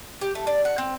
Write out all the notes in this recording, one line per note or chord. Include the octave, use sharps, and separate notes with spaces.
G4
A3
D5
F#5
C4